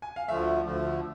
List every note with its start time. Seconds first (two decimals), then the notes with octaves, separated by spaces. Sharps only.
0.02 G#5
0.16 F5
0.28 D2 D3 F3 A3 E5
0.64 D2 D3 F3 A3